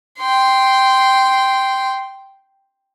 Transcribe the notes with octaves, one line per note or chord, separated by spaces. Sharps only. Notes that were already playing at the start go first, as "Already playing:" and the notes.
G5 C6